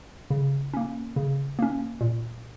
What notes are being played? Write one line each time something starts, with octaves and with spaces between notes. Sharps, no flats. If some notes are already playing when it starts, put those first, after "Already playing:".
C#3
A#3 C#4
C#3
A#3 C#4
A#2